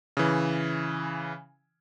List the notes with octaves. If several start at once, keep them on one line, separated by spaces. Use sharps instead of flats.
C#3 E3